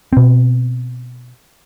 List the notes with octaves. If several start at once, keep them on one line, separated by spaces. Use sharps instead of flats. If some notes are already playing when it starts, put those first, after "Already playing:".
B2 C4